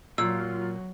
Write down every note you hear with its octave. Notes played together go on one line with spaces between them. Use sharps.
A#2 F#3 F4 E6